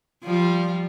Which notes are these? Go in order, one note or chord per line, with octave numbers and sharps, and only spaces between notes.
F3 G3 F4